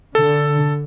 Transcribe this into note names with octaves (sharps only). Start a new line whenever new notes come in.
D3 A4